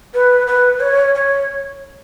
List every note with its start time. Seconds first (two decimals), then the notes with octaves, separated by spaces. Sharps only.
0.14 B4
0.47 B4
0.80 C#5
1.15 C#5